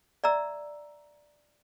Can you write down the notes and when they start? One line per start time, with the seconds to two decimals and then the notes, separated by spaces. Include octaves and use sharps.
0.24 D5 E5 A#5 E6